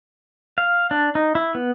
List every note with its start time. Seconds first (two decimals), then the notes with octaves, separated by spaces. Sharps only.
0.58 F5
0.91 D4
1.15 D#4
1.35 E4
1.55 B3